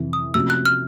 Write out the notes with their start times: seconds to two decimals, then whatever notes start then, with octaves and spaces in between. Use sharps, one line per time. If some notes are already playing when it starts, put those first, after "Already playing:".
Already playing: F2 C3 E3
0.13 D#6
0.34 C3 F3 A3 C#4 F#4 E6
0.50 F#6
0.65 F6